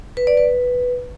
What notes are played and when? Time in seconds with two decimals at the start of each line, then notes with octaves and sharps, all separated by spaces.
0.17 B4
0.27 D5
0.37 B4